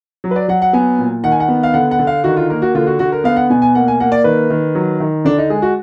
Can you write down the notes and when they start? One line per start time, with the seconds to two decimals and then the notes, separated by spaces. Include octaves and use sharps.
0.24 F#3
0.31 B4
0.36 D5
0.48 F#3 F#5
0.62 F#5
0.73 B3 G#5
0.99 A#2
1.24 D#3 F#5
1.32 G#5
1.40 F#5
1.48 B3
1.63 F5
1.74 D3 F#5
1.91 F#5
1.99 D3
2.07 F5
2.24 D#3 F#4
2.37 F4
2.50 A#3 A#4
2.62 F#4
2.75 D3 F4
2.87 F#4
2.99 D3 F#4
3.12 A#4
3.24 B3 F5
3.36 F#5
3.50 B2 G#5
3.62 G#5
3.75 A#3 F#5
3.88 G#5
4.00 A#3 F#5
4.12 D5
4.24 D#3 B4
4.50 D#3
4.75 F#3
5.00 D#3
5.25 D3 D4
5.38 D#4
5.50 G#3 G#4
5.62 F#4